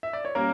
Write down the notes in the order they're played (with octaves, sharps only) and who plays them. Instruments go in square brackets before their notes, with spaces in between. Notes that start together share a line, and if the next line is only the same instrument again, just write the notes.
[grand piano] E5
D5
C#5
[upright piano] G3 C#4 [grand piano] A#3 A#4